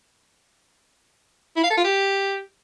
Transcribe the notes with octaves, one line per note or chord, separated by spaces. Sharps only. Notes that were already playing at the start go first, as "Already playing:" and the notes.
E4
F5
A4
F4
G4